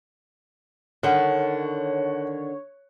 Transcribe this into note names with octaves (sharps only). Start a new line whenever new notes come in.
D3 D#3 C#5 F#5